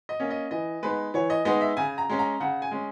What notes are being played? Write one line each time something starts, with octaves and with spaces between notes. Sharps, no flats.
D#5
A#3 C#4
D#5
E3 D#5
G#3 B3 D#4 B4
E3 C#5
D#5
G#3 B3 D#4 D#5
E5
C#3 G#5
A#5
G#3 C#4
A#5
C#3 F#5
G#5
G#3 C#4